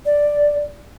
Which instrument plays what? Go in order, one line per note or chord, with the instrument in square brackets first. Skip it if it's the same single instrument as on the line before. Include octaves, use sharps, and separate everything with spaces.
[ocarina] D5